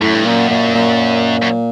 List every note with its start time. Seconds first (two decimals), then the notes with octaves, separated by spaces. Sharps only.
0.01 F#2 A2
0.15 G2
0.25 F#2 A#2
0.50 A#2
0.74 A#2
1.42 F#2